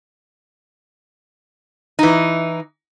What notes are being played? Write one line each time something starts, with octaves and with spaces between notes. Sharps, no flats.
E3 D#4